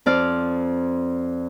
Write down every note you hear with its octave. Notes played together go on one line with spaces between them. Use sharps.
F2 F4 D5 F6